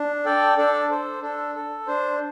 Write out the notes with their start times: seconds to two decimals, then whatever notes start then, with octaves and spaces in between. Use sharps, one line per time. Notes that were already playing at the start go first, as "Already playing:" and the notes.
Already playing: D4
0.25 A4 D5 G5
0.58 D4 A4 D5
0.91 A4 C5
1.22 D4 A4
1.55 A4
1.87 D4 C5